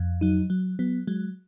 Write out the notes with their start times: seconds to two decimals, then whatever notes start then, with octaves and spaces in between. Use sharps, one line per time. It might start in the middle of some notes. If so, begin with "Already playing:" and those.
Already playing: F2
0.21 F#3 D#4
0.50 F#3
0.79 F#3 B3
1.07 F#3 G#3